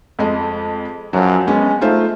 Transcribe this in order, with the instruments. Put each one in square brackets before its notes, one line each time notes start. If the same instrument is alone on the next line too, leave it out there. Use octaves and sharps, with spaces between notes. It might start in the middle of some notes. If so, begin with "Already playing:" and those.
[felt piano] F2 G#3 D#5
[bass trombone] F#2 [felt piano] F3 F#3
[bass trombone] G#3 [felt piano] B3 C#4
[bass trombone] A3 [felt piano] D#4 F4 C5